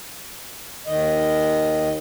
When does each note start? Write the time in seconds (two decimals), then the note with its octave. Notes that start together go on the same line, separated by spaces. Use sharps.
0.87 D#2 D#3 D#5